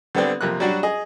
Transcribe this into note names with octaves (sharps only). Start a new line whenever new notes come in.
D3 G3 B3 C4 D4
F2 C3 A#3 F#6
F#3 G3 D4 F#4
G#4 D#5